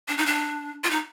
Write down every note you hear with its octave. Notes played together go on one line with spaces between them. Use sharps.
D4
D#4
D4
F4
D#4